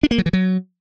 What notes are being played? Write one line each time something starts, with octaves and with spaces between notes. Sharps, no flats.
D4
A#3
F#3
E3
F#3